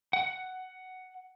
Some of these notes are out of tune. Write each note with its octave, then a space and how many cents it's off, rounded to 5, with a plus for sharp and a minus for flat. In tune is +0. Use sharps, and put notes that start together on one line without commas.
F#5 +5